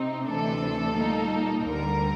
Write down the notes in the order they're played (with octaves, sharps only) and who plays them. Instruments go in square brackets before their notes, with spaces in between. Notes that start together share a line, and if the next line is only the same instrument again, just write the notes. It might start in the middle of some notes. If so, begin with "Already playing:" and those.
Already playing: [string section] C3 C4 D#4
D2 C3 E3 A3 D4 A4
A#2 G3 A#3 D#4
D2 D3 G3 A#4